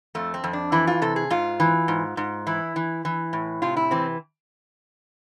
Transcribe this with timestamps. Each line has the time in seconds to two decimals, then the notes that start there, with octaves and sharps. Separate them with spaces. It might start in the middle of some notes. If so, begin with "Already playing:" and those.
0.15 F2 A3
0.34 C4
0.44 F2
0.53 D4
0.72 E3 E4
0.87 F4
1.02 C3 A4
1.16 G#4
1.30 G#2 F4
1.60 E3
1.88 G#2
2.17 G#2
2.47 E3 E4
2.76 E3
3.05 E3
3.33 A2
3.62 C3 F4
3.77 E4
3.91 E3 C4